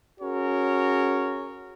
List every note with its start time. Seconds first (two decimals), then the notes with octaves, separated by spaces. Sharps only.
0.21 C#4 F#4 G#4 A#4 C#5